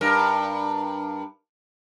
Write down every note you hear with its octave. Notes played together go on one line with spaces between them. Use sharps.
G2 A#4